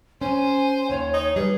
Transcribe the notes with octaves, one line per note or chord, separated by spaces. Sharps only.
C#4 C5 G#5
D#2 D#3 C#5
D#4 C#5
G3 G#4 B4